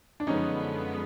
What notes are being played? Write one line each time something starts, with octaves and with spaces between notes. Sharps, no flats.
D4
F#2 D3 F3 G#3 B3 C#4 D#4